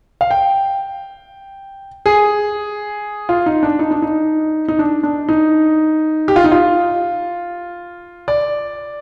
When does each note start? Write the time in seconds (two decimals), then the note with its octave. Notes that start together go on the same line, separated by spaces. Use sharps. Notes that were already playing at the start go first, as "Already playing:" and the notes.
0.21 F5
0.31 G5
2.06 G#4
3.29 F4
3.46 D#4
3.63 D4
3.79 D#4
3.91 D4
4.02 D#4
4.68 D#4
4.79 D4
5.03 D4
5.29 D#4
6.28 G4
6.36 F4
6.44 D#4
6.52 F4
8.28 D5